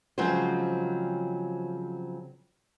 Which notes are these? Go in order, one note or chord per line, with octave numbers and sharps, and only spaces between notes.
C#3 F3 F#3 G#3 C4 C5